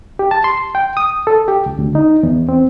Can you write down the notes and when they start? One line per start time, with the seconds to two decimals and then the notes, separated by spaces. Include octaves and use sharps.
0.19 G4
0.31 A5
0.44 C6
0.75 G5
0.97 D#6
1.27 A4
1.48 G4
1.66 C#2
1.79 D2
1.95 D#4
2.23 E2
2.49 C4